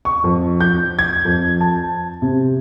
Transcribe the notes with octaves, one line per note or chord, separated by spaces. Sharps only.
C#6
F2
G6
G#6
F2
A5
C3